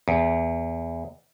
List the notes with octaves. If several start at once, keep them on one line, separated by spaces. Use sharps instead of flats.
E2